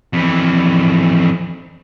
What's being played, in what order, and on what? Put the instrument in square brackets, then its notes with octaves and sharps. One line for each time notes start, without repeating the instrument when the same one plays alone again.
[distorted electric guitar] F2 E3